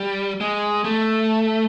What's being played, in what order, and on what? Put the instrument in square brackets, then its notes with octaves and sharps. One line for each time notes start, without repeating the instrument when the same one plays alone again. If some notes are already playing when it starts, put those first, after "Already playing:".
Already playing: [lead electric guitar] G3
G#3
A3